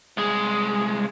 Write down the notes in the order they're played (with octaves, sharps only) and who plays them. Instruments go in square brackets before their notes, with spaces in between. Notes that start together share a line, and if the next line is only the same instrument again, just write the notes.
[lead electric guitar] C2 G#3